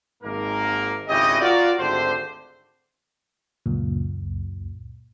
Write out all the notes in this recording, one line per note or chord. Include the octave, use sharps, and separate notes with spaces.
G#1 G#2 A#3 A#4
G#1 C#3 E4 G4 D#5
F4 F#4 A#4 D5
G#1 D2 D3 G4 C5
C#2 F#2 A#2